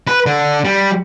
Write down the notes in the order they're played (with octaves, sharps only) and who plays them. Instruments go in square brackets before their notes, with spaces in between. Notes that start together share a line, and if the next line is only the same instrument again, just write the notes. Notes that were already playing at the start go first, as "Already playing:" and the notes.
[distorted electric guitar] B4
D3
G3